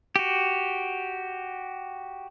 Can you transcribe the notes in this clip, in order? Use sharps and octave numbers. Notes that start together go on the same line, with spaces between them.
F#4 G4